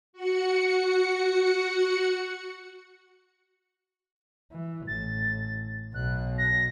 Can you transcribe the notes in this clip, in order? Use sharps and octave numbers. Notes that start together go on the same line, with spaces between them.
F#4 F#5 C#7
E3
A1 A6
B1 B2 F#6
A#6